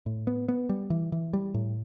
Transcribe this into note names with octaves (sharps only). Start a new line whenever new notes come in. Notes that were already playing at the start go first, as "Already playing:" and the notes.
A2
B3
B3
G3
E3
E3
G3
A2